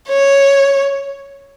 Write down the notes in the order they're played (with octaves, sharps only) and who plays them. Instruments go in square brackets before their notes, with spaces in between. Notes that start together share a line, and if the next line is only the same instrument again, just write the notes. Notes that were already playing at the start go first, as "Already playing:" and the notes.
[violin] C#5